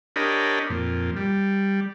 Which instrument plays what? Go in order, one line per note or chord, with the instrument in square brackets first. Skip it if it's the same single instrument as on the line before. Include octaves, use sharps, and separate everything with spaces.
[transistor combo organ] D4 G4 A#4 C#5 D#5 B5
F2 A#2
G3